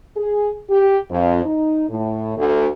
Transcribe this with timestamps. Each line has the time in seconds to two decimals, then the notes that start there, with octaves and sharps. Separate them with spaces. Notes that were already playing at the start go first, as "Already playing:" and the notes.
0.16 G#4
0.70 G4
1.10 F2
1.46 D#4
1.89 A2
2.37 D2